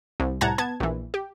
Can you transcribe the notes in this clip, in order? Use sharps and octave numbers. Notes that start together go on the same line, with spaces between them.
C2
C2 A2 F#5 A5 A#5 G#6
B3 A5 G#6
A#1 E3
G4